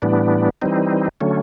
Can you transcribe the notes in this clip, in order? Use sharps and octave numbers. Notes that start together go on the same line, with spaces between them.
A2 E3 G3 B3 D4
E3 G3 C4 D#4
D3 F#3 A3 C#4